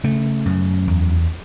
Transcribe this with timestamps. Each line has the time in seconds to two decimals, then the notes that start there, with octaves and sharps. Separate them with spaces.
0.04 C#3 A3
0.46 F#2
0.87 E2